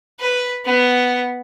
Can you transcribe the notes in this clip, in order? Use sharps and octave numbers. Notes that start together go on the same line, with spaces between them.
B4
B3